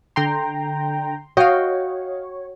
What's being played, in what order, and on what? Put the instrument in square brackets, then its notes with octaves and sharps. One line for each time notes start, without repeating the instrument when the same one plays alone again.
[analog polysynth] D3 G5 A#5 [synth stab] C6
[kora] F#4 G5 [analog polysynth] C#5 [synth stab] D#5 F5